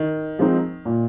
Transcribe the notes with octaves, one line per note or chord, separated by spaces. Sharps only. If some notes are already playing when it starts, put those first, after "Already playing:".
Already playing: D#3
F3 G#3 C4 D#4
A#2